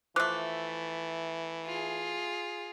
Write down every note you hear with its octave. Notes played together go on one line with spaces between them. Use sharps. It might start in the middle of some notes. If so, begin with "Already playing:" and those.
E3 F3 A3 D6 F#6
F4 G#4